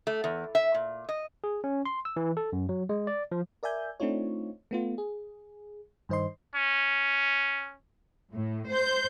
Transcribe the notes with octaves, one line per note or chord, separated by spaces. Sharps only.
A3
E2
E5
A#2
D#5
G#4
C#4
C6
E6
E3
A4
F#2
F#3
G#3
D5
F3
A#4 D5 E5 G#5 G6
A3 C4 D4 D#4 F4 C#5
A3 B3 F4
G#4
G2 D#3 C5 D#5 C6
C#4
A2
C5 G6